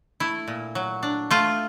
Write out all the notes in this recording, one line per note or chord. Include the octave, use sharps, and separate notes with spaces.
A3 E4
A#2
F#3
D4
A3 F4